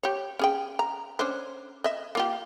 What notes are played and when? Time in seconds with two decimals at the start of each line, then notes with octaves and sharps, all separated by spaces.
0.03 G4 C#5
0.39 C#4 G#4 G5
0.79 A#5
1.19 C#4 D4 C5
1.84 D#5 E5
2.15 A#3 F4 G4